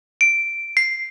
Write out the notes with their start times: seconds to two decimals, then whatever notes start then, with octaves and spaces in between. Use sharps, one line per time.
0.21 D7
0.77 C7